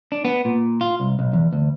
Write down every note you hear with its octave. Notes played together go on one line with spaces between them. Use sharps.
D4
B3
A#2
F4
C2
B1
E2
D2